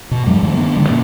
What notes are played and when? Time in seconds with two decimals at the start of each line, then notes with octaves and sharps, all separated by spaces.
0.11 B2
0.26 F2 G#2 F#3 G#3
0.43 G2 D#3 G3 A3
0.55 D#3 B3 C4 D4
0.76 G2 D3 G#3
0.89 G2 B2 A#3 C#4